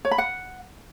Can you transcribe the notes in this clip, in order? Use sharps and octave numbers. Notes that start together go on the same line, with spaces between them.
C#5
B5
F#5